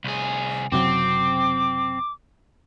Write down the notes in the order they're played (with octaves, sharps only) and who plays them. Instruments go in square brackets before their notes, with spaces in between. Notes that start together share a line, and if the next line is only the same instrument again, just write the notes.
[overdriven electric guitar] C2 G#4
[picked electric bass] F#1 C3 F#3 [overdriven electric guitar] C4 [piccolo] D6